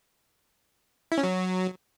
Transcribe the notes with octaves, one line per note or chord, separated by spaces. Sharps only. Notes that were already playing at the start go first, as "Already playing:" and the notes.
E4
C#4
F#3